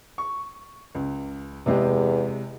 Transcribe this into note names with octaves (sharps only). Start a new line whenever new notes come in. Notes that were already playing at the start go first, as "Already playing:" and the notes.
C#6
C#2
E2 C3 G#3 G4